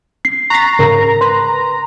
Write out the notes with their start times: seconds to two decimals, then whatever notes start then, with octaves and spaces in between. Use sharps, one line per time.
0.25 C7
0.50 A#5 C#6 F#6 A6 B6 C7
0.79 G#2 C#3 A#4
1.21 B4 C6